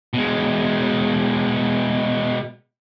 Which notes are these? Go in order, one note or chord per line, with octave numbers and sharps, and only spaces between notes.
B2 G#3